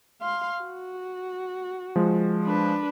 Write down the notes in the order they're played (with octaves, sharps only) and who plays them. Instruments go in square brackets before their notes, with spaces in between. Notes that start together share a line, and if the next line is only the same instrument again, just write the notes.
[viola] F5 C6
F#4
[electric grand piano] F3 G#3
[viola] D4 B4